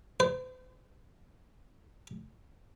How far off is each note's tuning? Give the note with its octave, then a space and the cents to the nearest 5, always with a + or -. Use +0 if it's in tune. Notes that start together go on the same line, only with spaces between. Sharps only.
C5 -45